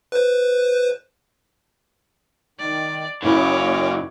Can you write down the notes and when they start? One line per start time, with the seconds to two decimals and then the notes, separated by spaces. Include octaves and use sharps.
0.12 B4 C5
2.59 D#3 D5
3.22 F#2 C#3 F#3 A#3 C#4 E4 C#5 D6